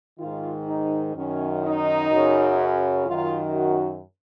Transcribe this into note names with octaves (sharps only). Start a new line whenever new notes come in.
G#2 D#3 F4
D#4
F#2 D#3 C#4
D#4
F#2 C#3
F#2 D#3 F4
F#4